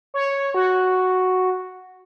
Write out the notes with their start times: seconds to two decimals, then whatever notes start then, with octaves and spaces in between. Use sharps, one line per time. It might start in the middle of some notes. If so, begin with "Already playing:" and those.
0.14 C#5
0.54 F#4